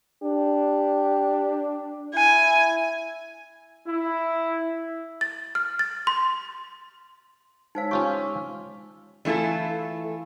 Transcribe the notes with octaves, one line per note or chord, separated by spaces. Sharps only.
D4 G4
E4 G#5
E4
A6
F6
A6
C6
G#3 D#4 C5 C#5 F5 E6
C#4 F4 G4 C#6
E3 A3 E4 F4 A4